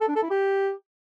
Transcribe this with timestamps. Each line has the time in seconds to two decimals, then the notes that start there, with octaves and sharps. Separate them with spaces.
0.01 A4
0.08 D4
0.15 A4
0.23 E4
0.30 G4